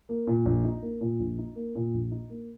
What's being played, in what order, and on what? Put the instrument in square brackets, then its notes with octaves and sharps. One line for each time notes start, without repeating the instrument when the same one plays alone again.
[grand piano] A#3
A#2
A#1
D#4
A#3
A#2
A#1
D#4
A#3
A#2
A#1
D#4
A#3